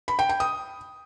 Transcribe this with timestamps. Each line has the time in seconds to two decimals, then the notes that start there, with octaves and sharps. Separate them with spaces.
0.08 B5
0.19 G5
0.29 G5
0.40 D#6